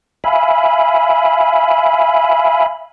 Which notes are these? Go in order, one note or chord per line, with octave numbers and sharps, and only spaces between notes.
E5 F5 G#5 B5